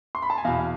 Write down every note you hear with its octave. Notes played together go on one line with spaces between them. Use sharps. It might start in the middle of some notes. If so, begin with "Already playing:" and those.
C6
B5
A5
G#5
E2 B2 F5
F5